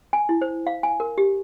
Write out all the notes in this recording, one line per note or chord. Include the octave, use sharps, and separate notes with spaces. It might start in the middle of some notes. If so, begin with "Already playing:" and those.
G#5
E4
C5
F5
G#5
A#4
G4